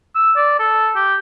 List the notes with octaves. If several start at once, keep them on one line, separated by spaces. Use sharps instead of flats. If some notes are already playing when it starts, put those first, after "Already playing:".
E6
D5
A4
G4